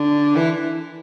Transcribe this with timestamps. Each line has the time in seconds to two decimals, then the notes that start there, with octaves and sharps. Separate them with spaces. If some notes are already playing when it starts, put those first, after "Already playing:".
Already playing: D3
0.36 E3